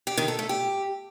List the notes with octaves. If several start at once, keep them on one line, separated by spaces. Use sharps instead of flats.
G4
D#3
A4
A3
G4